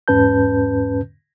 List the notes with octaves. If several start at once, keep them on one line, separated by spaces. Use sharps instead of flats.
E2 G#2 C#4 B4 A5 G6